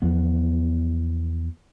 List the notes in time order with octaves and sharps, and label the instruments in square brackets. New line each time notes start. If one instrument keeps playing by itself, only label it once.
[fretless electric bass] E2 F3 B3